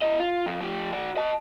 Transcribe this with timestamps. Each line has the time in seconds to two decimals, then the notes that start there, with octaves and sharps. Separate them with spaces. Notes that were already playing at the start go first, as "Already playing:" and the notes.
0.02 E4 D#5
0.20 F4
0.46 F2
0.61 F3 G4
0.92 F#4 D5
1.17 D#5 A5